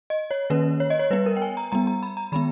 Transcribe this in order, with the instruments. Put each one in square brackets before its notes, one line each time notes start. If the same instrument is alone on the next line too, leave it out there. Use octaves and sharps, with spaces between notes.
[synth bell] D#5
C#5
D#3 A#3 C#4 B4
C#5
D#5
C#5
G3 B3 B4
A#4
G5
G#5
A#5
G3 B3 A#5
A#5
B5
A#5
D#3 G#3 B3 B5